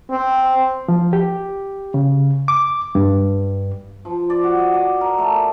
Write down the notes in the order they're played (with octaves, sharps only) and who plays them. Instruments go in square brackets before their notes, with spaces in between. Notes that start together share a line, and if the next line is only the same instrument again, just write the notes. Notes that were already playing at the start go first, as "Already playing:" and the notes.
[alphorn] C4
[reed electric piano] F3
G4
C#3
D6
G2
[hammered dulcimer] F3
D5
F#4
D#5
D5
A#4
A3
G#4